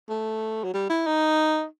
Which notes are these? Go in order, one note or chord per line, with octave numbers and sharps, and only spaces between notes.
A3
F#3
G3
E4
D#4